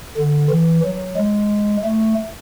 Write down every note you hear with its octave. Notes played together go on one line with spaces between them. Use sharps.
D3
E3
F#3
G#3
A3